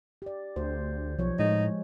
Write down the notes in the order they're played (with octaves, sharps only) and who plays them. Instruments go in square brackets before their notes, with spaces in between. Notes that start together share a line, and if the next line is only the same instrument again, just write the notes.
[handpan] G4 D5
[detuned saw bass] D2 [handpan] C5
[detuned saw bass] B1 [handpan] F3 C#5
[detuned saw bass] A2 [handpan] G#3 [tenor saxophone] D#4